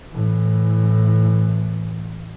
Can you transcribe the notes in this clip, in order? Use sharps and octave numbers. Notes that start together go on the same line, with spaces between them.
A2 E3